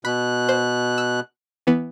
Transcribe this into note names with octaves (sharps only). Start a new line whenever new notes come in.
B2 B5 F#6
C5
E6
E3 B3